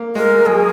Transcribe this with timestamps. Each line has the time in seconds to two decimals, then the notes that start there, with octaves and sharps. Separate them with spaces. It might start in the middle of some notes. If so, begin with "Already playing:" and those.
Already playing: A#3
0.15 G#3 A#4
0.46 F#3 G#4